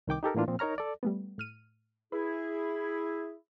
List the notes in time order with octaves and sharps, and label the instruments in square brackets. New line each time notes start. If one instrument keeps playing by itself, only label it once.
[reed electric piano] C2 D#3 G5 D6
D#4 G4 A4 A#4
A2 E3 A#3 D4 F4
A#2 F3 C4
D#4 A#4 C#5 A#5 F6
A4 D5
[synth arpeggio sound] G3 A3 B3
A2 F6 D#7
[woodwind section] E4 G#4 [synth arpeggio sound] B4